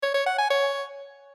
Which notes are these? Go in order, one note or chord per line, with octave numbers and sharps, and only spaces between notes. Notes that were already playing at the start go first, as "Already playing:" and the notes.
C#5
C#5
F#5
G#5
C#5